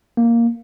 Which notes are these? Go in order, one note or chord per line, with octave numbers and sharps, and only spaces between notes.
A#3